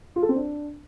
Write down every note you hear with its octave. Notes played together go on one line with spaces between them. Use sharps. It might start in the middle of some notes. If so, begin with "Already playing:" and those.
F4
A4
C4
D4